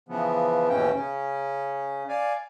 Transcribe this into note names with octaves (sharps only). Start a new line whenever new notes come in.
C#3 E3 F3 B3
D#2 G#2 B2 E3 C#4 G5
C#3 C#4
D5 F5 G#5